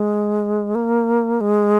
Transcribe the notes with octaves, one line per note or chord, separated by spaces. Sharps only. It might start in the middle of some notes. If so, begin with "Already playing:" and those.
Already playing: G#3
A#3
G#3